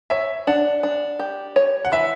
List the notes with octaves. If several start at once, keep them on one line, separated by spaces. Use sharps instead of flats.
C#5 E5
D4 F#5
D4
G4
C#5
F#5
E3 E5